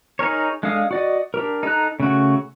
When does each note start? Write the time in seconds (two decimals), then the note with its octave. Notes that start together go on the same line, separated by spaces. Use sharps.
0.19 D#4 G#4 A#4 C#5
0.63 G#3 D4 A4 F5 D#6
0.91 F#4 D5 D#5
1.34 D4 G4 A#4
1.63 D#4 A4 A#5 F#6
2.00 C#3 A3 F#4